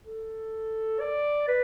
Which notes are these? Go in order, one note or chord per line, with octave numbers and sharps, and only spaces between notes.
A4
D5
B4